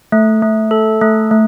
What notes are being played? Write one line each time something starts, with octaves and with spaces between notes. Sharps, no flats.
A3
A3
A4
A3
A3